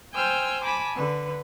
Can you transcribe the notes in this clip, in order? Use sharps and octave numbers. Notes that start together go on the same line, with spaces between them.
C5 G5 G#5 E6 F6 G6
G#5 A5 B5 D6
D3 B4